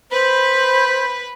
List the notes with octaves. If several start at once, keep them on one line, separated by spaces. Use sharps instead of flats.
B4 C5 B5